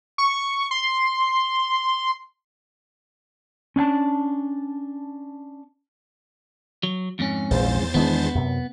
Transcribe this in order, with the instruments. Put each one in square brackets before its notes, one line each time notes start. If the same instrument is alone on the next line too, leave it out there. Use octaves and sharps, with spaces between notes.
[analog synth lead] C#6
C6
[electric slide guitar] C#4 D4 G#5 A5
[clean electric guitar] F#3
F2 G#2 C#4
[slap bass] A#1 [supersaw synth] E2 C5 A6
[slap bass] D#3 G#3 D4 [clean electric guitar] B3
[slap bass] F#2 C3